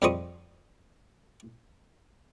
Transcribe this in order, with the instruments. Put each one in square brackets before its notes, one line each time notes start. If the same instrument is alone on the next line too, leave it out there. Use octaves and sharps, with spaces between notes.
[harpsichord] F2 F3 G3 G#3 C#6 D#6